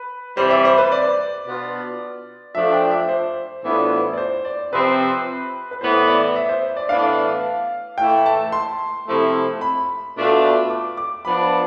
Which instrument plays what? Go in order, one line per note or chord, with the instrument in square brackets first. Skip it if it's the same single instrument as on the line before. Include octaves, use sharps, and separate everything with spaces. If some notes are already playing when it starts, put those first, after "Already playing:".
Already playing: [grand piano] B4
[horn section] C3 E3 G3 [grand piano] C5
[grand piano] E5
C5
B4
D5
[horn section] B2 B3 D4 F4
[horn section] F3 A3 D4 F4 [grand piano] E5
[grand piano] G5
E5
C5
[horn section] A2 E3 B3 D4 F4
[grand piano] D5
C5
D5
[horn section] C3 F3 C4 [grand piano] B4
[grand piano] B4
[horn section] A2 E3 B3 [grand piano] C5
[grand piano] D5
E5
C5
D5
[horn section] A2 E3 B3 D4 [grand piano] F5
[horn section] A2 E3 A3 E4 [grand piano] G5
[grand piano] A5
C6
[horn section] C3 F3 A3 E4
[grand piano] B5
[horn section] B2 A3 D4 F4
[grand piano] D6
D6
[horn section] F3 B3 D4 [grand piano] B5
[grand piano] A5